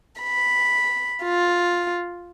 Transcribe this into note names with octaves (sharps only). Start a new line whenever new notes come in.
B5
F4